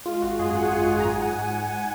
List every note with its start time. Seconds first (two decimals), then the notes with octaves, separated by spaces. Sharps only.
0.06 G#3 F4
0.22 G#1 F#4
0.39 F#2 G#4
0.55 F#2 F#5
0.68 G#5
0.72 G#3 F#5
0.88 F#2 G#5
1.00 A#5
1.05 G#2 G#5
1.22 G#2 F#5
1.38 G#2 F#5
1.55 G#2